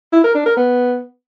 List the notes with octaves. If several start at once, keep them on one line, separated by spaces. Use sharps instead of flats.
E4
A#4
D4
A#4
B3